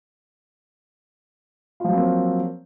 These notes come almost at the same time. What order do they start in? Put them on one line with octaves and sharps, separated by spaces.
F4 F3 F#3 C4 A#3